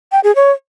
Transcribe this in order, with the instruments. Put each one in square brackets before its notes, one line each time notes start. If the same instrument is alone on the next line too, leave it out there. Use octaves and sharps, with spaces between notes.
[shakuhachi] G5
G#4
C#5